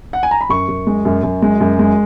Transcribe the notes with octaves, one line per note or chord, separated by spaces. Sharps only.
F#5
G#5
A#5
B5
F#2 C#6
F#2
G#3
F#2
F#2
G#3
F#2
G#3